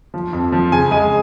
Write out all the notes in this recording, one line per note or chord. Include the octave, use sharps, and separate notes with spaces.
F3
F2
F3
C#3 G#5
G#3 G#5